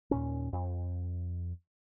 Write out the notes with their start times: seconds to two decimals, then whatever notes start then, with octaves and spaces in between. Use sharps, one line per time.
0.11 D#2 A#2 C#4
0.53 F2